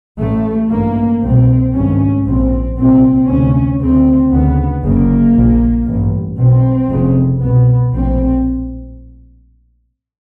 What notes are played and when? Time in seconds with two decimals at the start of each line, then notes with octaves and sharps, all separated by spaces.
0.19 A1 A2 A3
0.70 A1 G2 A#3
1.23 C2 B2 C4
1.74 G#1 G2 C#4
2.25 A#1 A#2 C4
2.77 C2 A#2 C4
3.29 D2 C3 C#4
3.81 D2 C#3 C4
4.32 D2 C#3 B3
4.83 F#1 F#2 C#3 A#3
5.35 A#1 A#2
5.87 A1 G2
6.37 B1 B2 C4
6.89 F1 F2 C#3
7.41 C2 B2 B3
7.93 A#1 A2 C4